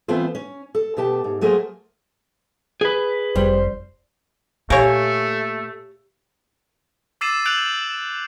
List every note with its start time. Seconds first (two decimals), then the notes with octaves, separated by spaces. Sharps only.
0.08 E3 A3 B3 C4 F4 C5
0.35 C#4
0.75 A4
0.97 B2 A3 G4 A5
1.24 G#2
1.41 F#3 A3 A#3 G#4 A#4 C5
2.81 G#4 B4
3.36 F1 G3 C5
4.70 A#2 A3 G4 A#4 C#5 F5 G#5
7.21 D6 E6 A6 C7 D#7 E7
7.46 F#6 G6 D7 F7 F#7